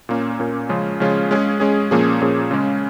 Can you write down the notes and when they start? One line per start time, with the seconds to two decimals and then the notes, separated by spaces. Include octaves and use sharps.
0.09 A#2 A#3 C#4
0.40 A#2 A#3 C#4
0.69 C#3 F3 G#3 C#4 F4
1.00 C#3 F3 G#3 C#4 F4
1.31 G#3 C#4 G#4
1.60 G#3 C#4 G#4
1.91 A#2 F3 A#3 C#4 G#4
2.21 A#2 F3 A#3 C#4 G#4
2.51 C#3 G#3 C#4